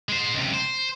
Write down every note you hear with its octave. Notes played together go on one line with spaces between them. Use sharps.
G#3 C5
C#2 C3
C5